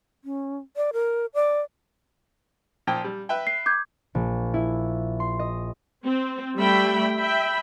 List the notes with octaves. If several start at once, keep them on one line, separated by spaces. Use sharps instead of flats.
C#4
D5
A#4
D5
A#2 F3 G5
G3
B4 E5 G5
C7
D6 G6 G#6
A#1
E4
C6
D#5
C4
G3 A3 E5 G5 B5
E5 G5 B5